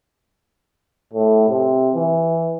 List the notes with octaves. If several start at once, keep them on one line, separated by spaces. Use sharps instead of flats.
A2
C3
E3